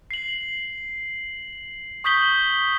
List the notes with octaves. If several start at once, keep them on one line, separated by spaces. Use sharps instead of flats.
C7 F#7
C#6 D#6 G6 B6 F#7 G7